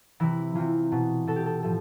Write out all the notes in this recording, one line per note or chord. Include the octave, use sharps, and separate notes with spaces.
C3 E3 E4
C3 E3 F4
B2
B2 A4
G4
A4
A2 F3 A4